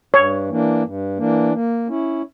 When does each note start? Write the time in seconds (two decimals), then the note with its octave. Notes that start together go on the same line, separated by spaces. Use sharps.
0.14 G2 C#5
0.48 E3 A#3 D4
0.83 G2
1.18 E3 A#3 D4
1.53 A#3
1.88 C#4 E4